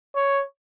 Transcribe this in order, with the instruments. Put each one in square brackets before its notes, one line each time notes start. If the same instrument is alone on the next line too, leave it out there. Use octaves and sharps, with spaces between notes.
[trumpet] C#5